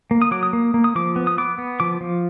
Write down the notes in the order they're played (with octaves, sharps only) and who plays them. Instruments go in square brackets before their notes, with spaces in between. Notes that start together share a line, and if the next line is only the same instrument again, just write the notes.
[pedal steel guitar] A#3
D#6
F#3 D6
D#6
A#3
A#3
D#6
F3 D6
B3
D#6
B3 D6
B3
F3 D6
F3